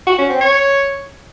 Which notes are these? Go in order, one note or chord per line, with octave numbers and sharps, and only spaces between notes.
F#4
C#4
C4
C#5